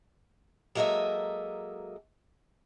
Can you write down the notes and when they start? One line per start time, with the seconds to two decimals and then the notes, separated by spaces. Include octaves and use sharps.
0.75 F#3 G#3 A#3 A4 D#5 E5